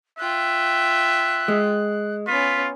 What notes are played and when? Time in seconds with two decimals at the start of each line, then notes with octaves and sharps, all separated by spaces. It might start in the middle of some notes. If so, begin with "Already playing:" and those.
0.19 F4 E5 G5 F#6
1.48 G#3
2.27 B3 C#4 F4 B6